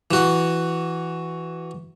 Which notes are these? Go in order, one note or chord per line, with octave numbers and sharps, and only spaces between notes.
E3 F#4